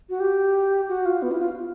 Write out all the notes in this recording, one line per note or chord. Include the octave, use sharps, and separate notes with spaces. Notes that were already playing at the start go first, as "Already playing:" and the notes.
F#4
G4
F#4
F4
B3
E4
F4